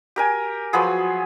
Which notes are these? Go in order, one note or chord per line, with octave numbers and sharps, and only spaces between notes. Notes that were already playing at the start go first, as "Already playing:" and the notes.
G4 A#4 G#5
F3 F#3 B3 G#4